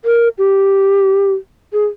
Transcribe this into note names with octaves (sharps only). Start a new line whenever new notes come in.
A#4
G4
G#4